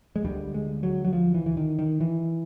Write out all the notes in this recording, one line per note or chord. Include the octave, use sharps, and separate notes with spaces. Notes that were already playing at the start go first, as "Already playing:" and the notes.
G#3
D2 D3 G3
G#3
F#3
F#3
F3
E3
E3
D#3
D#3
E3